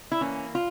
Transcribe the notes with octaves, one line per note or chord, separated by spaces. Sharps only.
E4
E3 A#3 C#4
F4